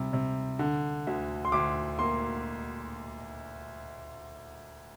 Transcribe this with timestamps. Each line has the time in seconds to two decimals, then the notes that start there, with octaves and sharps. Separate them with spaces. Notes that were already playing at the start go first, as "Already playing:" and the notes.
Already playing: C3 G3
0.13 C3
0.59 D3
1.07 D2
1.45 C6
1.52 D2 D6
1.99 A#3 C6